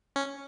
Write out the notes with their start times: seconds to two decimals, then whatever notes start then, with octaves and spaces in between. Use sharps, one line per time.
0.16 C#4